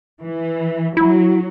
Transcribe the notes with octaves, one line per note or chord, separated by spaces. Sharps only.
E3
F#3 E4